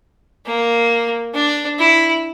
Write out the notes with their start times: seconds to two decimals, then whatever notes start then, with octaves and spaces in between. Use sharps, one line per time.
0.46 A#3
1.34 D4
1.79 E4